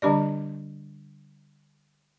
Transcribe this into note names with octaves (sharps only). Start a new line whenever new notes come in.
D3 G3 D4 G4 D5